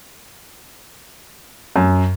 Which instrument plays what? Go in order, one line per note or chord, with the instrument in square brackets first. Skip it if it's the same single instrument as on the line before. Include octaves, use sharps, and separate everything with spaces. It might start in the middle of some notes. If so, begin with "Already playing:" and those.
[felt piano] F#2